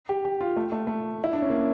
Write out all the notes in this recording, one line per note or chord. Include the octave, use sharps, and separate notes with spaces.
G4
G4
F4
A3
A3
A3
E4
D4
C#4
A#3